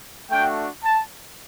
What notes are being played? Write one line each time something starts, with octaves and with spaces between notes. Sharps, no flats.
A3 D4 F#4 G5
A5